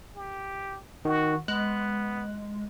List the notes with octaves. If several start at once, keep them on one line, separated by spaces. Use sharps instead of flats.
G4
D#3 F#4
G#3 B3 F#6